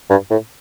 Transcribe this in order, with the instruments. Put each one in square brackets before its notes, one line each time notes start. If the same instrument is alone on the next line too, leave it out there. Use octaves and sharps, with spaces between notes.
[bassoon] G2
A2